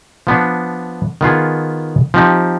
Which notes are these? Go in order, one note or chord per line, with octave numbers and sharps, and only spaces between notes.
F3 B3 D4
D#3 B3 F4 G#4
F3 C4 D#4 G4